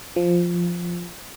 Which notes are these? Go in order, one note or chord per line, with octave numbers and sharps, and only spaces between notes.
F3